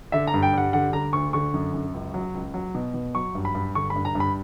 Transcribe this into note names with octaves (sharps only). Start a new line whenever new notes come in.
D3 E5
A#5
G2
G5
G3 F#5
D3 F#5
D3 A#5
D2 C#6
D3 C#6
F#2
F#2
C#2
F#3
C#2
F#3
B2
B2
F#3 C#6
G2
B5
G2
D3 C#6
B5
G2
A#5
G2
B5